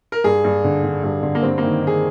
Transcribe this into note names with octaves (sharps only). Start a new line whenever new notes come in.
A#4
G2 G#4
G2
D3
D3
G2
D3
A#3
G2 C4
D#3 A#3
D#3 G#4